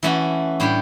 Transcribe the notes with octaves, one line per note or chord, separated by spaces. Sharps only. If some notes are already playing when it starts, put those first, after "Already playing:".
E3 A3 C#4 F#4
A2 G3 D4 G4